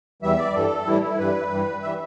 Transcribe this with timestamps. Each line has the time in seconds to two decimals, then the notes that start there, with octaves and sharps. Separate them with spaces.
0.22 E2 E3 G3 E5
0.38 D5
0.54 G2 E3 G3 A4
0.87 A2 E3 G3 E4
1.03 E4
1.18 G2 E3 G3 B4
1.51 G2 E3 G3
1.83 E3 G3 E5